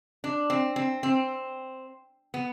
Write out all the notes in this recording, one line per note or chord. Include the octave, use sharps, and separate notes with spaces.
D4
C4
C4
C4
B3